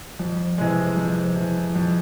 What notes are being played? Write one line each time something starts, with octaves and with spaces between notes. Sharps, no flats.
F2
C3 E3 G#3
F2
C3 E3 G#3
F2